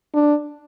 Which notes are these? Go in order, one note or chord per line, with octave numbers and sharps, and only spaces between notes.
D4